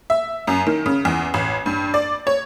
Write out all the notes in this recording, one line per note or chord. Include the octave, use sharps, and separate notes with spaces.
E5
F#2
D#3
C#3
E2
A1
G2
D5
C#5